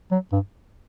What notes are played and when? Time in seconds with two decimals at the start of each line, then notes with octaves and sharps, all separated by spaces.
0.11 F#3
0.32 G2